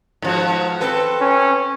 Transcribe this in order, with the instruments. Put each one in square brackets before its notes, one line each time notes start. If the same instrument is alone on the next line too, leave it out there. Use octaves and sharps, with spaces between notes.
[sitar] G#2 F3 F#4
C4 A4 B4
[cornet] C#4